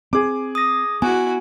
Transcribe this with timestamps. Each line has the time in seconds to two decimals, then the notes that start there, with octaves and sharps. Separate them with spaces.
0.13 C4 G#4 D6
0.55 D#6 A#6
1.02 B3 E4 F#4 G#5